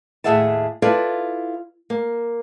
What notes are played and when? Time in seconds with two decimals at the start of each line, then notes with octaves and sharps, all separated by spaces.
0.24 D#2 A2 G#4 E5 F#5 A5
0.82 E4 F4 A4 B4 D5 F5
1.90 A#3